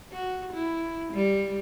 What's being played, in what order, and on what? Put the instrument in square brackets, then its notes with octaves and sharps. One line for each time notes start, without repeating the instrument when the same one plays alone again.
[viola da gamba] F#4
E4
G3